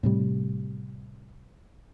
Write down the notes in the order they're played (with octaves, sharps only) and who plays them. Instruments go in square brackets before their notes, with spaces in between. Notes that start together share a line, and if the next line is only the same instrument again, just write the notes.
[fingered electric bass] A2 C3 G3